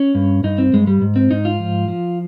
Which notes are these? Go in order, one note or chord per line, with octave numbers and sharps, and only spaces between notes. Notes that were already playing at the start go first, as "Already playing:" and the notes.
Already playing: C#4
G2
G2 D#4
C4
G2 G#3
G3
G#2
C4
G#2 D#4
F4
F3
F3